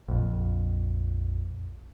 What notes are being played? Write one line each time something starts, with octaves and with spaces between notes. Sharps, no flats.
A#1 F2